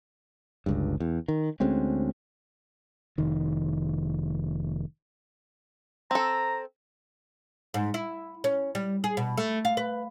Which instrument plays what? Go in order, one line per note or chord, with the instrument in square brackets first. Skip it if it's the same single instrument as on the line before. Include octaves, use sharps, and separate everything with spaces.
[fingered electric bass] G1 C#2 G2
E2
D#3
D2 G#3 C4 C#4
F1 D#3
[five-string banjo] C4 A4 [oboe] A#5
[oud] G#2
E4
C#4
G3
G#4
B2
A3
F5
B4